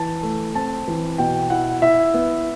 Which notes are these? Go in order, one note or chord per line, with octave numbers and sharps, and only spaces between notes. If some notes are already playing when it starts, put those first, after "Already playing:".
Already playing: E3 A5
A3
C4 A5
E3
B2 G5
E4 F#5
E4 E5
B3